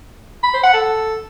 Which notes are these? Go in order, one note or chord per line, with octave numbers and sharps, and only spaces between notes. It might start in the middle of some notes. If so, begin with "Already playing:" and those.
B5
C5
F#5
A4